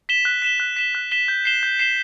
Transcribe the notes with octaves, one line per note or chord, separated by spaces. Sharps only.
B6 E7 G7
F#6
B6 E7 G7
F#6
B6 E7 G7
F#6
B6 E7 G7
G6
C7 E7 G7
G6
C7 E7 G7